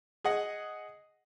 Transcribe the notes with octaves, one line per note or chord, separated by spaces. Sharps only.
G#4 D#5 F#5